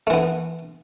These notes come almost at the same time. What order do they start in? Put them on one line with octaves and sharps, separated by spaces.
A3 E3 B3